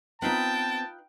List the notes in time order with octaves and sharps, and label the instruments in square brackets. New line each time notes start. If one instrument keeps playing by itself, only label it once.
[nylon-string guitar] B3 C4 [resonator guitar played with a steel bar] D#4 F4 B4 [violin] G5 [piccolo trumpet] A5